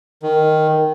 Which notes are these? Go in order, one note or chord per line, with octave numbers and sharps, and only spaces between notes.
D#3